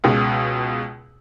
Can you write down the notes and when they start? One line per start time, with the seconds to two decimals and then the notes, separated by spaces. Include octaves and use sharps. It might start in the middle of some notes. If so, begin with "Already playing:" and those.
0.04 C#2 B2 G#3